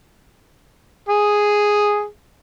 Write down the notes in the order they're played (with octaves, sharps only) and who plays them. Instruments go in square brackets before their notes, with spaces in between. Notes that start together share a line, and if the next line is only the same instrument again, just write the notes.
[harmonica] G#4